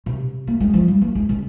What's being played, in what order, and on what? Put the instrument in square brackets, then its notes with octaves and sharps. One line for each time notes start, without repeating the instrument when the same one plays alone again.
[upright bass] C3
A#3
G#3
F3
G3
A#3
G#3
C#3